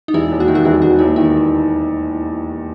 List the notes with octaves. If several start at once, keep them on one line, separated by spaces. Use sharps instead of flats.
D#4
E1 E4
D#2
F#4
D#3 E4
F#4
E1 E4
E1 F#4
D#2 E4
D#3 E4